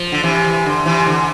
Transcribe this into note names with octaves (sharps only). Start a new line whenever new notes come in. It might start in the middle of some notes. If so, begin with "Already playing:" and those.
Already playing: F3
D3
C3 E3
D3
C3 E3
D3